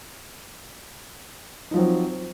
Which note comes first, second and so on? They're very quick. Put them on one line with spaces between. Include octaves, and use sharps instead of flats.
D#4 F3 F#3 C4